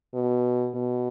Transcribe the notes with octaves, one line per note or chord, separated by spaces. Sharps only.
B2
B2